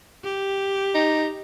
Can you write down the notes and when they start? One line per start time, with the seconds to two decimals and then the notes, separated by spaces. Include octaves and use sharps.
0.24 G4
0.95 D#4